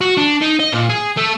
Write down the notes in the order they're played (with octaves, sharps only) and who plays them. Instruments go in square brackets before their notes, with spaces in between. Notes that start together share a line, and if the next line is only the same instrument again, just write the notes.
[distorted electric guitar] F#4
D4
D#4
D#5
A#2
G#4
A3